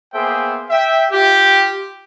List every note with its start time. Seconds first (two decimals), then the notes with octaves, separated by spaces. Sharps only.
0.14 A#3 B3 G#4 C5 E5 G5
0.70 E5 G5
1.11 F4 G4